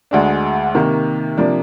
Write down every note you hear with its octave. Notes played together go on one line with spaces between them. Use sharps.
D2 D3 G#3 D4
C3 D#3 A#3
C3 F3 A#3 D4